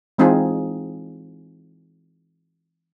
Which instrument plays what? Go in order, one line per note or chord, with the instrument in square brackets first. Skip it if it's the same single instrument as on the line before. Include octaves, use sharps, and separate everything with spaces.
[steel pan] E3 G#3 C4 D#4 F4 G#4